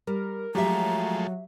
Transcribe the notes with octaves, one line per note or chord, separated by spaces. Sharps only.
G3 A#4
F3 F#3 G#3 A3 G4 E5 A#5